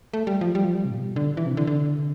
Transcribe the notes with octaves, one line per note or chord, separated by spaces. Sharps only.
A3
G3
F3
G3
F3
G3
C3
A2
B2
D3
E3
C3
D3
D3